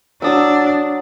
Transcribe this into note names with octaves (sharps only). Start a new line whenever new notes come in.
F#3 D4 D#6 E6